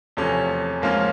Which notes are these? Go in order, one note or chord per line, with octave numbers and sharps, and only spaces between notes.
E2 C3 F3 A3 C#4
G#2 F3 A#3 C#4 F4